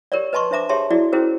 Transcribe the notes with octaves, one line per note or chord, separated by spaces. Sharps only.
G4 A#4 C#5 D5
B4 D#5 A5 C6 C#6
D4 C5 E5 A#5 D6
G4 G#4 C#5 E5 A5 C6
E4 F#4 G#4 D5
C#4 E4 F#4 G#4 A#4 C5